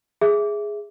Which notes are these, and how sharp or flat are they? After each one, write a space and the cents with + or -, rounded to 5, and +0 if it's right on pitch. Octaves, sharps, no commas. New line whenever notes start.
G#4 +0 E5 +0